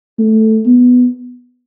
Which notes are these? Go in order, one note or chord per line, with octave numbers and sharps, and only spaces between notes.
A3
B3